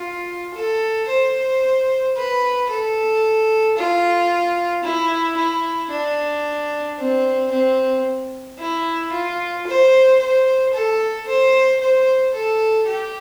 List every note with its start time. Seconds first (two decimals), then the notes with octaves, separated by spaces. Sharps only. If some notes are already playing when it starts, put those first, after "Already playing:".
Already playing: F4
0.54 A4
1.08 C5
2.16 B4
2.70 A4
3.77 F4
4.83 E4
5.37 E4
5.90 D4
6.99 C4
7.51 C4
8.59 E4
9.12 F4
9.67 C5
10.19 C5
10.73 A4
11.27 C5
11.81 C5
12.34 A4
12.87 G4